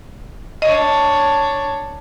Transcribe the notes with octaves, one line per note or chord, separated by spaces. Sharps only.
D4 C#5 D#5